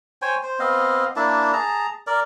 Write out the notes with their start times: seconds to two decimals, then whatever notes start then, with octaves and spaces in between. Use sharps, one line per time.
0.22 C5 C#5 G5 G#5
0.43 C5
0.60 B3 C4 D#5 F5
1.16 A#3 D4 E4 A5
1.53 G#4 A5 A#5
2.07 A#4 D5